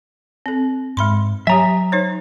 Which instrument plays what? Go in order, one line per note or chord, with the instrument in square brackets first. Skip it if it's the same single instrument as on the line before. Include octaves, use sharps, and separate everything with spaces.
[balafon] C4 A4
[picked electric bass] G#2 [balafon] G#3 B5 C6
[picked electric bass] F#3 [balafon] G4 C#5 G#5 [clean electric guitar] E5 A#5
[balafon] D#4 C5 C#5